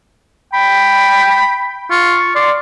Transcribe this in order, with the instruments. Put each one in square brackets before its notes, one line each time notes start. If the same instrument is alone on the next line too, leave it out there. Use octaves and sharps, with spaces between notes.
[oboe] G5 [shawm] B5
[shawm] F4 [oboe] C#6
[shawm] D5 [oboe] C6